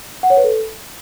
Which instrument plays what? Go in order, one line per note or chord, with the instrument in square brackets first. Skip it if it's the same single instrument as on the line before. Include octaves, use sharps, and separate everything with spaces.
[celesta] F#5
C#5
B4
A4